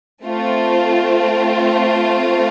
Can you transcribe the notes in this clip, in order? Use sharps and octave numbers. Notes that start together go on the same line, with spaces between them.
A3 C4 F4